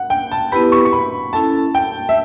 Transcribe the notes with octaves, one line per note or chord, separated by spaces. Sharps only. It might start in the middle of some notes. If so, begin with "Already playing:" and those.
Already playing: F#5
G5
A5
B3 E4 G4 B4 B5
C#6
C#6
B5
C#4 E4 A4 A5
G5
E5